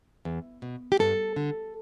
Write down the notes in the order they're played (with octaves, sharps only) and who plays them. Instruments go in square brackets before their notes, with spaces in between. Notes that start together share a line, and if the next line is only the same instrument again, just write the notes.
[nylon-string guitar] E2
B2
G4
G2 A4
D3